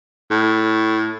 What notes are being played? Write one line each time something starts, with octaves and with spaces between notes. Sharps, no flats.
A2